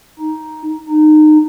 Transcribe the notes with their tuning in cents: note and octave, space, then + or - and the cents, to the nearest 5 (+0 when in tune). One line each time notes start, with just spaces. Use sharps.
D#4 +5
D#4 -25